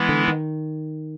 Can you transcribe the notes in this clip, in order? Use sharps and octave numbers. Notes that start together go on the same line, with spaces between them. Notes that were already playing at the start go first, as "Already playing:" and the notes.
Already playing: E3 G#3 B3 E4
D3
D#3